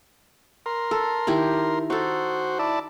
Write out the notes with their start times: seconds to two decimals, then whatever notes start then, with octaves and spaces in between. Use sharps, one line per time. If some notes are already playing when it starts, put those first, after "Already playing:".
0.66 A#4 C6
0.91 A4
1.27 D#3 E4 G4
1.90 D#4 F#4 A4 C5
2.59 E4 D5 A5